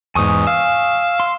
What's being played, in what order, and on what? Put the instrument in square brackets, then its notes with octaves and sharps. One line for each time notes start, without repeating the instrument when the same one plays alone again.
[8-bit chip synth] E2 G#2 [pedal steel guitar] G#5 C#6 D#6
[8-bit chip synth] F5 E6
[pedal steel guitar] C6